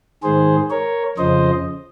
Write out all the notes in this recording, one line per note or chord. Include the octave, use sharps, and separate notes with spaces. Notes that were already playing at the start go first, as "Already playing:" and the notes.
G#2 D#3 G#4 C5
A#4 C#5
F2 C#3 F3 C5 D#5